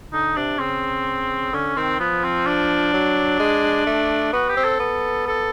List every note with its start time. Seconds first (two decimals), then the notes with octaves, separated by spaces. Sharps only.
0.13 D3 D#4
0.36 C3 D4
0.59 C#3 C4
1.53 D3 C#4
1.76 D#3 C4
1.99 F3 B3
2.24 C4
2.46 D4
2.93 F#3
3.40 G#3
3.87 A3
4.33 B3 F#4
4.49 G4
4.57 C4
4.64 A4
4.80 B3
5.27 A4